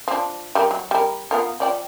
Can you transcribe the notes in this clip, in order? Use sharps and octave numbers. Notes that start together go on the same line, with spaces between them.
F3 D4
G3 G4 A#4
F#3
G3 A#4
B3 F4 A#4
F3 D5 G5